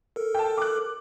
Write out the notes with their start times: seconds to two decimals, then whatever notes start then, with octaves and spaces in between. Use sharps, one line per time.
0.16 A4 A#4
0.35 G5 A5
0.57 D6 F#6